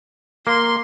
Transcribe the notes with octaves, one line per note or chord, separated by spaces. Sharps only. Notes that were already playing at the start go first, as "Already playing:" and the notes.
A#3 C6